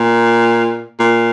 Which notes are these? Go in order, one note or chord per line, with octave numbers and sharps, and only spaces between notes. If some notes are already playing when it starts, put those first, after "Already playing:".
Already playing: A#2
A#2